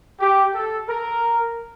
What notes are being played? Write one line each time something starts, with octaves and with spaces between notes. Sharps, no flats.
G4
A4
A#4